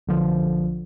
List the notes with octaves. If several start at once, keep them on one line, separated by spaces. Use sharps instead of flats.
B1 D3 F3